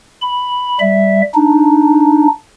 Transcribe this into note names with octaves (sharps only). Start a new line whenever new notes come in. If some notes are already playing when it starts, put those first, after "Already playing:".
B5
G3 E5
D4 D#4